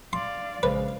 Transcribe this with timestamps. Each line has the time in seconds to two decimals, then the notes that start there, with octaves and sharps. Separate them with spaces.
0.13 D5 F5 C6
0.63 A#1 C#3 G#3 B4 C5 F5